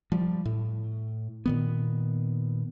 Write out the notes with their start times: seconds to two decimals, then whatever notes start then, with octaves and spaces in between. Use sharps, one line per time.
0.12 F3 G3
0.45 A2
1.46 A#2 D#3 B3